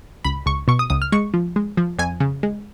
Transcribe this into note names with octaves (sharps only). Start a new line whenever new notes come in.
C#2 B5
C#2 C#6
B2 C#6
D#6
C#2 D#6
F6
G#3 C#6
F3
G#3
F3
F2 G#5
C#3
G#3